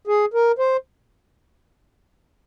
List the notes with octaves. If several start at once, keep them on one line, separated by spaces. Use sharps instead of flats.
G#4
A#4
C5